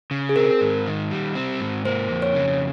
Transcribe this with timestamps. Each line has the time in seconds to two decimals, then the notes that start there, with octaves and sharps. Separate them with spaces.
0.11 C#3
0.29 G#4
0.36 C4 A#4
0.61 G#2
0.87 D#3
1.11 G3
1.35 C4
1.60 G#2
1.85 A#3 C5
2.11 F2
2.22 C#5
2.34 C#3